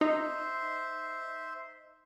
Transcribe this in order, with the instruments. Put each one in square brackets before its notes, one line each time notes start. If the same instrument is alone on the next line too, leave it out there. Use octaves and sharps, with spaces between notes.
[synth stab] D#4 [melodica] C5 E5 C6